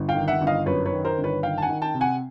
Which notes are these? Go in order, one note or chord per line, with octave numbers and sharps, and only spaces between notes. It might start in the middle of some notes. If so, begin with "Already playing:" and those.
Already playing: G1
F5 G5
D#3
E5 F#5
G1
D#5 F5
F#2 B4 C#5
B4 C#5
D#3
A#4 C5
G1
B4 C#5
D#3 F5 G5
A5
F#5 G#5
D#3
G5 A5
C3
F#5 G#5